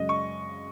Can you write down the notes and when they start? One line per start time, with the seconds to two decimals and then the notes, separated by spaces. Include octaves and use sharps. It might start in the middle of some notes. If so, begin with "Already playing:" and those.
Already playing: F#2 C#3 G#3 D#5
0.09 C#6